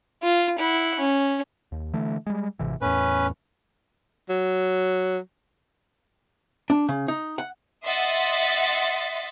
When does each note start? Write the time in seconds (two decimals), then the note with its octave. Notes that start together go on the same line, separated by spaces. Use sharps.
0.23 F4
0.58 E4 F#5
1.00 C#4
1.72 D#2
1.93 D3 E3 A3
2.26 G3 G#3
2.59 G#1 C3 E3
2.82 E2 A2 C#4 B4
4.30 F#3
6.70 D4
6.89 C#3
7.08 D#4
7.38 F#5
7.85 D#5 E5 F#5 C6 A6 B6